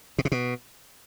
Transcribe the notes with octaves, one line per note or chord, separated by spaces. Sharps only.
B2
C3
B2